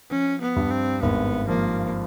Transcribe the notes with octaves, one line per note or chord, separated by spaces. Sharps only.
F3 C#4
B3
G2
C4
G#1 B3
F3 A#3